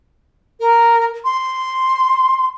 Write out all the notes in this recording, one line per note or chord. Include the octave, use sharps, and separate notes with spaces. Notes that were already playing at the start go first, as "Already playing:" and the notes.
A#4
C6